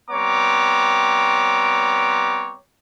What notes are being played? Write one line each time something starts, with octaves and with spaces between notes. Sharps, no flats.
G3 B3 C4 C#5 A#5 D6